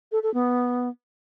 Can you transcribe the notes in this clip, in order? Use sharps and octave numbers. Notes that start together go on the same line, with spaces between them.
A4
A4
B3